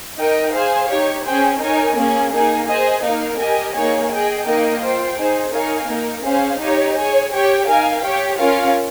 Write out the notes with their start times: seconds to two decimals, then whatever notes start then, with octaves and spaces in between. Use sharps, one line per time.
0.18 D#4 A#4 D#5 G5
0.53 G#4 C5 F5
0.89 D#4 G4 C#5
1.25 C#4 G#4 C5 G5
1.60 D#4 A#4 C#5 G#5
1.96 A#3 C#4 G#4
2.32 A#3 D#4 G#4
2.67 G#4 C5 D#5
3.03 A#3 D#4 A#4 F5
3.39 G4 A#4 D#5 G#5
3.74 A#3 D#4 G#4 C#5
4.10 G#4 D#5 G5
4.46 A#3 D#4 A#4 D#5 G5
4.81 F4 C5 G5
5.17 D#4 G#4 C5
5.53 D#4 A#4 C#5 F5 G#5
5.89 A#3 D#4 A#4
6.24 C#4 G#4 C5 F5
6.60 D#4 G4 C#5
6.96 G#4 C#5 G#5
7.32 G4 C#5 G5
7.67 D#4 A#4 F5 G#5
8.03 G4 C#5 G5
8.39 C#4 F4 A#4 C#5 F5